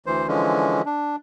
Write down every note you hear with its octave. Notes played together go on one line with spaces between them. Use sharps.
D2 E3 C5
D3 E3 F3 G#3 C#4
D4